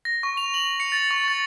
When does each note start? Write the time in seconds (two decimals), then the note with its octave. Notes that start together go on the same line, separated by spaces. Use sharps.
0.05 A#6
0.23 C#6
0.37 F7
0.54 F#7
0.80 C#7
0.92 A6
1.11 C#6
1.28 A6